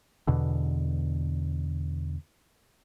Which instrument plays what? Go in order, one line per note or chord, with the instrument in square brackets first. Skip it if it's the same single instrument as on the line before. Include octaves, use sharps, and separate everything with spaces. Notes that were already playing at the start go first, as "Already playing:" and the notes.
[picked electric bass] E2 B2 D3